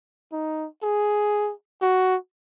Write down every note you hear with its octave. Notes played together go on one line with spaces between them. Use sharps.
D#4
G#4
F#4